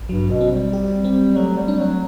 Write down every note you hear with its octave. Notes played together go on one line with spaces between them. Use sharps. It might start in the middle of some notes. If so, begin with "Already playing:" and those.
Already playing: A1
G2 F#3
B2
C4
G3
G4
C4
F#3 A3
G3
D4
F#3